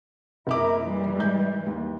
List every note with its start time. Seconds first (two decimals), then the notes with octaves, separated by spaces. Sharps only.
0.47 F#1 E4 A#4 E5 D6
0.81 E3 G3
1.16 G#2 G6
1.66 D#2